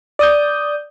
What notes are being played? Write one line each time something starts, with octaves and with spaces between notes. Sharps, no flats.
D5 D#6 G6